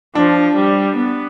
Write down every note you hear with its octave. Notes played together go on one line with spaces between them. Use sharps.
F3 D4
G3
B3